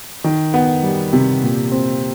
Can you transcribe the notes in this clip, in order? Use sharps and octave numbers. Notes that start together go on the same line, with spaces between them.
D#3
B3
G3
C3
A#2
C4